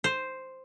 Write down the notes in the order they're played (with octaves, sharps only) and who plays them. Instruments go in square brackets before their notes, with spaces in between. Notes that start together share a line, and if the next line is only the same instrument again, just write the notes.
[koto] C5